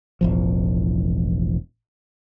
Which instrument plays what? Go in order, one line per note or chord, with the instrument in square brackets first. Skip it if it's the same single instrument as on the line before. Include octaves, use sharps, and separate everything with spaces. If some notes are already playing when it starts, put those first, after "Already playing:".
[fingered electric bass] E1 A1 F3